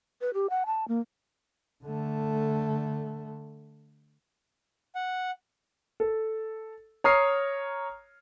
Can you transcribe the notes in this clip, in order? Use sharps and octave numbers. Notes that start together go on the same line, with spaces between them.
B4
G4
F#5
A5
A#3
D3 A3
F#5
A4
C#5 A#5 D#6 F6 C7